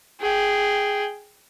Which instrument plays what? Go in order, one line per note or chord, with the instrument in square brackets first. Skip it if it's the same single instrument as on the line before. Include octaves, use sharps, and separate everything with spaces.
[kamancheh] G#4 G5